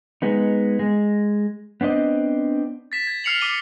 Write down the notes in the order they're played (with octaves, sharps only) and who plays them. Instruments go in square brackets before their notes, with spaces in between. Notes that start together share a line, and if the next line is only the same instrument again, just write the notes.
[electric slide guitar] G#3 B3 D#4
G#3
B3 C4 D4 D#5
[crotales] A6 B6 E7
G#6
F6 C7 C#7 F7 F#7
D6 B6 D#7 G7